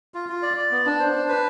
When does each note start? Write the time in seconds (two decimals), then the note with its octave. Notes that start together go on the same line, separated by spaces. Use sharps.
0.14 F4
0.29 F4
0.42 D5
0.57 D5
0.71 B3
0.86 D4
0.99 C5
1.14 D4
1.29 B4